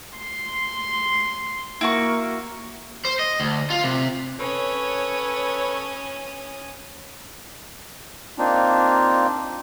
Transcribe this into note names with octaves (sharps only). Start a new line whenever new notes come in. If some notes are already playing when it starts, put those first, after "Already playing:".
C6
A#3 E4 F#4 C#6
C5
D#5
D2
F4
C3
C#4 A4 B4 C#5 D#6
A#3 C4 D4 D#4 F4